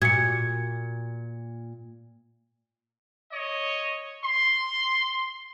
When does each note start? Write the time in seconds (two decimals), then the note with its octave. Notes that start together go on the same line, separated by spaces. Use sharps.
0.02 A#2 F#4 G#6 C#7
3.32 C#5 D#5
4.24 C6